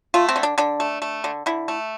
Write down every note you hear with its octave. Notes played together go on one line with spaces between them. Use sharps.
A3 F4
C4
D3
D4
D3 D4
A3
A3
D3
D3 E4
A3